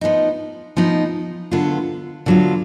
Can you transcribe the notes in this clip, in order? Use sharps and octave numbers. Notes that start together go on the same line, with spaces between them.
F3 B3 D#4
F3 B3 D#4
D3 F#3 B3 F4
D3 F#3 B3 F4